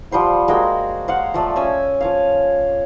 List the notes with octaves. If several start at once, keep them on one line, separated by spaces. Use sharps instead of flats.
F3 G3 C5 F#5
G#3 A#3 F#4 G5
C5 F5 F#5
F3 A3 D5
C#4 G#5 E6
F3 C#5 F5